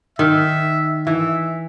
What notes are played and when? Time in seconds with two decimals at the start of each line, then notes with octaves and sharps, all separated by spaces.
0.19 D#3 E5
1.07 E3 E5